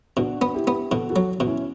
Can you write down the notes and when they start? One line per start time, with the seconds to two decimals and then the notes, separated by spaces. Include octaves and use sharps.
0.17 B2 D4 F#4
0.42 B3
0.54 E4 G4
0.67 B3
0.91 B2 F#4 A4
1.10 F#4 A4
1.16 F#3
1.40 B2
1.46 C#4 E4